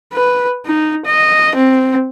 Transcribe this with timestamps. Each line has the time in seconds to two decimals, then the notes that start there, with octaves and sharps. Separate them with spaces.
0.14 B4
0.66 D#4
1.06 D#5
1.56 C4